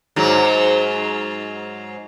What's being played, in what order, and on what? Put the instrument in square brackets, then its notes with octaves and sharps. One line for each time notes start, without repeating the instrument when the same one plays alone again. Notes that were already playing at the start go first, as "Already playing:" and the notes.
[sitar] G#2 F#3